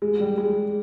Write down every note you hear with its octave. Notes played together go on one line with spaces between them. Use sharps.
G#3
G3
G#3